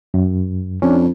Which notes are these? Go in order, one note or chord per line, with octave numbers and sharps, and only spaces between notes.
F#2
F2 C#4 D4